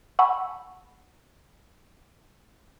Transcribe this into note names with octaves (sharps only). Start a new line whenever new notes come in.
F#5 G#5 A5 B5 C#6 E6